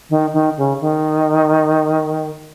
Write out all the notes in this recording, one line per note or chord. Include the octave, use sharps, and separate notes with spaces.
D#3
D#3
C#3
D#3